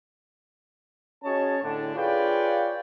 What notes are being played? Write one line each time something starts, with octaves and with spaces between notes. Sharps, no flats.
C#4 F#4 G#4 C#5 D#5 A5
A2 D3 D4
F4 G#4 B4 C#5 D5 G5